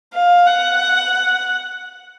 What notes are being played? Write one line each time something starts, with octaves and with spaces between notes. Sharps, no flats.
F5
F#5